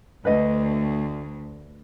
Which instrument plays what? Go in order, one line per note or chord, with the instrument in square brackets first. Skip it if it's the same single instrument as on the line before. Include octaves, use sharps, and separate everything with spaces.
[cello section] D2 [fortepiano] B4 D#5